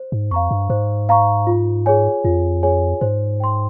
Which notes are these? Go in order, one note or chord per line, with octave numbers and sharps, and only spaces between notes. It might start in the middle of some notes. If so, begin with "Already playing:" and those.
Already playing: C5
G#2
F2 F5 A#5 C#6
G2
G#2 C5
F5 A#5 C#6
F4
G#4 C#5 G#5
F2 F4
G#4 C#5 G#5
G#2 C5
G5 C6